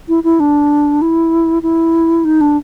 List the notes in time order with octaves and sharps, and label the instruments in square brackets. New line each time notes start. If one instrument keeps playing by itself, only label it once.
[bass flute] E4
E4
D4
E4
E4
D#4
D4